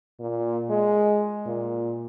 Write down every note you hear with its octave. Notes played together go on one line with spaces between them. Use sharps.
A#2
G#3
A#2